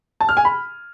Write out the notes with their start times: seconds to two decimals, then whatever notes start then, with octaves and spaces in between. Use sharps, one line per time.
0.21 A5
0.29 F6
0.37 G#5
0.45 B5